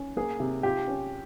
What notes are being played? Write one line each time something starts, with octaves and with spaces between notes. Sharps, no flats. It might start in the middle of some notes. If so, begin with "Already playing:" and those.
Already playing: C#4
A#3 G#4
C3
F4 G4
C#4